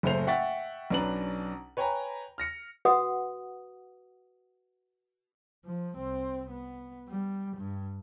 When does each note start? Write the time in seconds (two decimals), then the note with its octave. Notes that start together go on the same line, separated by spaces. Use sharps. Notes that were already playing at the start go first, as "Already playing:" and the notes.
0.03 F#1 A2 C#3 A3 C5 F7
0.27 E5 F#5 G5 C#6 A6 B6
0.90 B1 C#4 D4 B4 A#5 F#7
1.77 B4 C#5 G5 G#5 A#5 B5
2.38 F6 A#6 C#7
2.85 F#4 B4 F#5 D#6
5.65 F3
5.95 C2 C4
6.50 B3
7.08 G3
7.57 G2